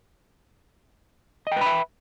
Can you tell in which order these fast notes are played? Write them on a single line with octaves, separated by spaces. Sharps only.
D#5 G5 B4 B5 E5